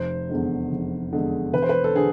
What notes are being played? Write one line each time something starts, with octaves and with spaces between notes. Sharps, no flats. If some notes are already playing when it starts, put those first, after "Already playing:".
Already playing: F1 C5
E2 D3 G#3
F1
E2 D3 G#3
E1 B4
C5
B4
A4
D3 G#4